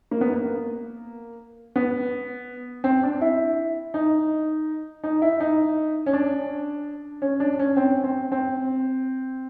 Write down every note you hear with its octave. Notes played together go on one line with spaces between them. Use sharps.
A#3
B3
A#3
B3
C4
D4
E4
D#4
D#4
E4
D#4
C#4
D4
C#4
D4
C#4
C4
C4
C4